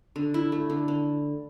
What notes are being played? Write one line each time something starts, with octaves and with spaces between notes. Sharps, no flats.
D3
E4
A3
D3
D3